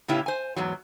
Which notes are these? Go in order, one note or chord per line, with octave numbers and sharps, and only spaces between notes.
A2 C#3 B3 C#4 E4 G4
C5 G#5
E2 G#2 F#3